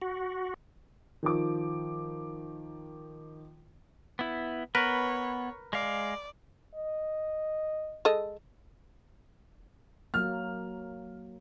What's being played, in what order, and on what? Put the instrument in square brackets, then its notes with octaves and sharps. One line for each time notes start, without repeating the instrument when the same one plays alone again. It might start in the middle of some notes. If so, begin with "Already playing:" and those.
[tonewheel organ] F#4
[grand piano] D#3 F3 D6
[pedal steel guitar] B3 E4
[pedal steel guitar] B3 [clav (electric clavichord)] A#4 B4 [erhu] C#5
[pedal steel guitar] G#3 F5 [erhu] D5
[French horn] D#5
[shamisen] G#3 A4 D#5
[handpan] F#3 A#3 [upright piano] F6